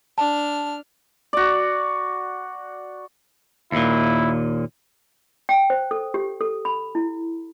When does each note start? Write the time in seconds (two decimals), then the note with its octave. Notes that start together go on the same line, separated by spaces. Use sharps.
0.18 D4 A5 F6
1.33 F#4 D5
3.72 D#2 A#2 E4
5.49 G5
5.70 C5
5.91 A4
6.14 G4
6.41 A4
6.65 B5
6.95 E4